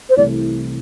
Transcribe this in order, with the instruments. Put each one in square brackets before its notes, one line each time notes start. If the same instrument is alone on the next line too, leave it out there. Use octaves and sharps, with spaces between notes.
[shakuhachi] C5
[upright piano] C2 C3 E3 A3 [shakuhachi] D5